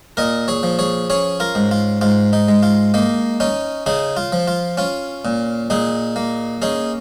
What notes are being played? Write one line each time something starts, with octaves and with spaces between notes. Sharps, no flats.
A#2 A#4 D#5
G#4 C#5
F3
G#4 C#5
C#4 G#4 C#5
F4 A#4
G#2
F4
G#2 F4
D#4
G#3
F4
A#3 D#4
C#4 D#4
C#3 D#4 G#4
F4
F3
F4
C#4 F4
A#2
A#2 D#4 G#4
A#3
C#4 D#4 G#4